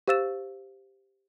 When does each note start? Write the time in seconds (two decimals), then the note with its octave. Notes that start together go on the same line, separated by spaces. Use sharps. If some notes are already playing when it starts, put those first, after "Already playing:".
0.08 G4 C5 F5 E6 A6 E7